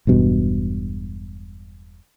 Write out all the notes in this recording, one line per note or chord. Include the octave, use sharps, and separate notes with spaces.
E1 G2 B2